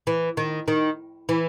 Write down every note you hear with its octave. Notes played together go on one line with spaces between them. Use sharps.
E3
D#3
D#3
E3